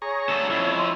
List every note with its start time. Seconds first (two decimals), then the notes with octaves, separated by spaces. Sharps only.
0.02 G#4 C#5 A#5 C#6
0.29 D2 A4
0.50 F2 C#4 E4
0.77 C6